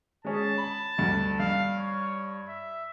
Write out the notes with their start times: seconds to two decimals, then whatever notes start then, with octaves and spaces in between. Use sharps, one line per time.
0.25 G#3 C#4 G#4 A5
0.58 B5
0.98 D2 G2
1.40 G2 F5
1.77 C#5
2.48 E5